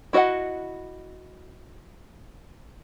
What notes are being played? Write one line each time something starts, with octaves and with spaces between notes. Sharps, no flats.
E4 F#4 D5 D#5 F#5